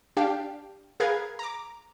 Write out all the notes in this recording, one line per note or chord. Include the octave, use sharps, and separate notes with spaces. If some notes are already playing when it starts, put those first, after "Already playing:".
D4 G4 F5 G5
G#4 A#4 B4 F5 G#6
A#5 D6